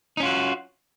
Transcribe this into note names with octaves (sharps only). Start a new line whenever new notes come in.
C#4 D#4 F4 F#4